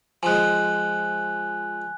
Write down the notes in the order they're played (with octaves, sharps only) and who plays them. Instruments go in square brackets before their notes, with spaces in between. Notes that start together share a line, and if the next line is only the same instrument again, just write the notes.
[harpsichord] F3 G#3 [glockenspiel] G#5 F#6